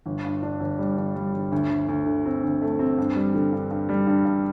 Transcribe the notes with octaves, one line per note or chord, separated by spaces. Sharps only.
G1
G2
D4
G1
G3
G1
G3
G1
D2
D2
D2
D3
C4
D2
A3
C4
G2
G3
D3
G2
G2
G3
G2
G2